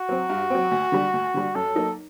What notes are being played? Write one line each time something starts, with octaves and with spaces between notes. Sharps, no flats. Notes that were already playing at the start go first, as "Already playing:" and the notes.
Already playing: F#4
F#3 C4
G2
F#3 C4
D2
D3 G3
D2
D3 G3
F#2 A4
F#3 A#3 D#4